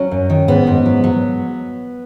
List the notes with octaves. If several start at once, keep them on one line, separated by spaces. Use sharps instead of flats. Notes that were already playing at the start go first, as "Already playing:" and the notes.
Already playing: F#3 C#4
F#2
D#3
G#2 B3
G#2
F#3
F#3